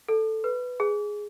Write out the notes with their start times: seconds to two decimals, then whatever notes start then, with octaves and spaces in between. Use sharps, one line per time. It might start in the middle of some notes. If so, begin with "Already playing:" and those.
0.09 A4
0.44 B4
0.80 G#4